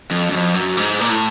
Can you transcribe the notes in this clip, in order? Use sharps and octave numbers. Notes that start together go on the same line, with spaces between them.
F2
F#2
F2
F#2
G#2
A#2
A2